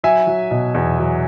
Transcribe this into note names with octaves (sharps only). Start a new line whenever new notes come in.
F#3 E5 G#5
F#3
B2
E2
F#3